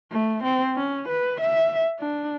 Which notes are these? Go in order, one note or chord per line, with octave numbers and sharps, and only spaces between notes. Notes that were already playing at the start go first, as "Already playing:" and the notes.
A3
C4
C#4
B4
E5
D4